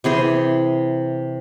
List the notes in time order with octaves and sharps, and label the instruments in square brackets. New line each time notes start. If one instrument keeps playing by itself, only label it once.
[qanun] C3 E3 G#4 C5